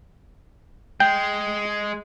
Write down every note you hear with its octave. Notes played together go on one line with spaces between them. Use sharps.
G#3 G5